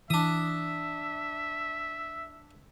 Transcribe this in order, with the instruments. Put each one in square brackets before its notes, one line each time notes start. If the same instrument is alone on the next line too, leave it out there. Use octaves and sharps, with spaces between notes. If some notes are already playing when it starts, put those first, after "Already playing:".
[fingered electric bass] E3 [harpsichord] D4 D#6 [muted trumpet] E5